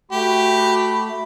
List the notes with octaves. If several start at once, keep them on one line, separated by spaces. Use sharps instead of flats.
A3 F#4 G4 B5